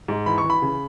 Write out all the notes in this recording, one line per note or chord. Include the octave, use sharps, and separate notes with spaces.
G#2
E3 B5
C#6
E3
B5
C#3